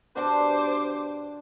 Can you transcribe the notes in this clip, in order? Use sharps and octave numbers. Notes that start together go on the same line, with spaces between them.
B2 D4 G4 C5 D6